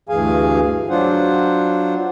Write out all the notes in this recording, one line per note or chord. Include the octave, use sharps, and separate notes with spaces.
D2 G2 E3 G#4 F5 G#5
F#3 D4 F4 C5 F#5